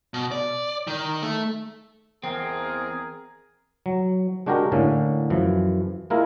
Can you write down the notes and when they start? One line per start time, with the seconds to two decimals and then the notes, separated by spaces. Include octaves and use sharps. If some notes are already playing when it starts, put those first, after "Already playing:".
0.14 B2
0.32 D5
0.87 D#3
1.23 A3
2.24 E2 C4 G#4 A#4
3.86 F#3
4.46 G#3 D4 F#4 G4 A#4
4.72 A2 D3 A#3 C#4
5.30 F#2 E3 F3
6.10 G#3 A#3 E4 F4 A#4